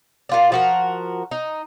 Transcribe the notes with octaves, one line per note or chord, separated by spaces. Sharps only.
A#2 F4 D5
F3 F#4 A#4
D#4